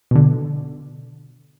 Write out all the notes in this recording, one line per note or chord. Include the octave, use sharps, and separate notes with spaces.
B2 D3